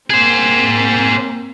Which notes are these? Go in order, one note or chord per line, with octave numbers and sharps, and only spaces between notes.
A#3 C4 G#4 C5